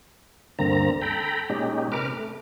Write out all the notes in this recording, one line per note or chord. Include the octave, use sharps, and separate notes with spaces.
D2 G2 D3 A#3 C4 A#5
A4 G5 A#5 B5
A#2 G#3 C#4 D#4 G4
C3 A#4 B4 D6 F6
A3